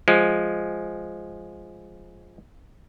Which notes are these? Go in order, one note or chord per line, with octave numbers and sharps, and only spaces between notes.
F3 G#3